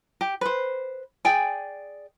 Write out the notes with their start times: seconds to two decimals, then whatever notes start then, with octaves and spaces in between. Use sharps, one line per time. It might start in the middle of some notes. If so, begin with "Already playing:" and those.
0.21 G4
0.41 B4 C5
1.25 G#4 D5 G5 G#5